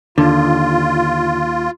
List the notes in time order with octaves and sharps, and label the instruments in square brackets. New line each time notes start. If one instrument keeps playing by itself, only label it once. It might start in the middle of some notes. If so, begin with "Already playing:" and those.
[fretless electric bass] D#2 [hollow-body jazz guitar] D3 [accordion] F4